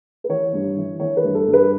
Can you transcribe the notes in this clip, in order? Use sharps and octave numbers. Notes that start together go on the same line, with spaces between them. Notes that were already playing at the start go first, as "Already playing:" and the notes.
B4
E3 C#5
G2
E3
E3 C#5
B4
G2
A4
G2
B4